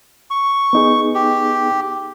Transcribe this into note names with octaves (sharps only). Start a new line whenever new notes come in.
C#6
B3 D#4 G#4
G4